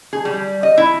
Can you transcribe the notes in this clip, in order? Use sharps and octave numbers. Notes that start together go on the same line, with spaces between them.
G#4
G3
D#5
E4